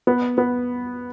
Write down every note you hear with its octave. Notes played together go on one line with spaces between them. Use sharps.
B3
B3